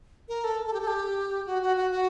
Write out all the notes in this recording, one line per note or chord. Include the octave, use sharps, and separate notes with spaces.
A#4
A4
A4
G4
A4
G4
F#4
F#4
F#4
F#4